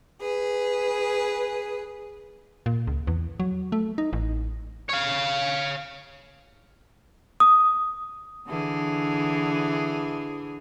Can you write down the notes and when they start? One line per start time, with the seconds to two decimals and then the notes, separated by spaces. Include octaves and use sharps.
0.21 G#4 B4
2.66 A#2
2.87 C#2
3.07 E2
3.40 F#3
3.72 A3
3.98 D#4
4.13 A1
4.89 C#5 F5
7.40 D#6
8.47 D3 E3 G#4